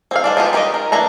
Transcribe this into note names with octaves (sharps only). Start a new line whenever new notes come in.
C4 G#4 F5
G#3 D4 D5
G#3 B3 D#4 F4 G4
D#3 C#4 G4 G#4 D#5
A#4
E3 A#3 D4 A#5